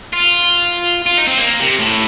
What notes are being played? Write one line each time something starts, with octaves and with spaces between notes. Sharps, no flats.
F4
F4
D#4
C4
A#3
C3
A2